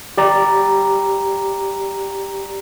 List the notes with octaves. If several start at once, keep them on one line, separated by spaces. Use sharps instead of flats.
G4 D5 A#5